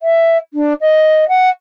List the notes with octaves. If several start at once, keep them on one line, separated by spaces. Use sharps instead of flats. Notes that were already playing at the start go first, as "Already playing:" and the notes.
E5
D4
D#5
F#5